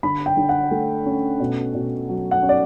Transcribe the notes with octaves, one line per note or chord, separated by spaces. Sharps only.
D3 B5
G5
D3
F#5
A3
C#4
B2
B2
F#3
F#5
C#4
D5